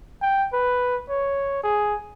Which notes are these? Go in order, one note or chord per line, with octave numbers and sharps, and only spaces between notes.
G5
B4
C#5
G#4